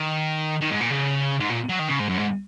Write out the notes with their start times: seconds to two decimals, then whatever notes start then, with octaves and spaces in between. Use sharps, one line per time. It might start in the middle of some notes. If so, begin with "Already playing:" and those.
Already playing: D#3
0.61 D#3
0.71 G#2
0.81 A#2
0.91 C#3
1.40 G#2
1.50 A#2
1.69 F#3
1.79 D#3
1.89 C#3
1.99 G#2
2.09 F#2
2.19 G#2